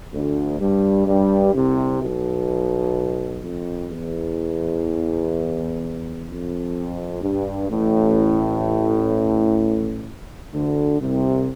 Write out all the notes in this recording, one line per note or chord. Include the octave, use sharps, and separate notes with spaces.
D2 D3
G2 G3
G2 G3
C2 C3
B1 B2
F2
E2
F2
G2
A1 A2
D2 D3
C2 C3